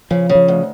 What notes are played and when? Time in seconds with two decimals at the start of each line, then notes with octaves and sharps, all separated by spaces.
0.11 C#3 F3
0.29 C#3
0.35 F3
0.48 D2